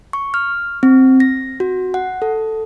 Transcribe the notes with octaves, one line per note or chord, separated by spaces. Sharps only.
C#6
F6
C4
A#6
F#4
F#5
A4